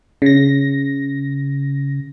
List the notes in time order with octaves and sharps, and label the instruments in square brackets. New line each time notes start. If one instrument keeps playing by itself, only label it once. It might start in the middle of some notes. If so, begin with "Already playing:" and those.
[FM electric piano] C#3 A#6